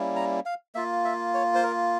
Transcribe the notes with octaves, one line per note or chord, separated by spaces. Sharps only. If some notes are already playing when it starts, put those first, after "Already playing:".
Already playing: G3 A#3 C#4 E4
A#5
F5
A#3 F4 E5
E5
C#5
C5
A#4